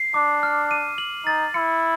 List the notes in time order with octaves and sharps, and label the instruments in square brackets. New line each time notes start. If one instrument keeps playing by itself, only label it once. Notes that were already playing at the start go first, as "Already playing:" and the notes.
Already playing: [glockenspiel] C7
[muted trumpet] D4 [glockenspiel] D6
[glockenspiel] F6
D#7
F#7
[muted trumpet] D#4 [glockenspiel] A6
[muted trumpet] E4 [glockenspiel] C#7